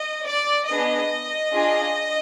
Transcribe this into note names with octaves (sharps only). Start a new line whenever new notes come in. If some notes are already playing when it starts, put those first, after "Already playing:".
Already playing: D#5
D5
B3 D4 G#4 D#5
D4 F4 G#4